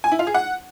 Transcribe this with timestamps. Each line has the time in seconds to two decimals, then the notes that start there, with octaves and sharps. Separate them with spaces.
0.04 G#5
0.12 E4
0.19 F4
0.27 G#4
0.34 F#5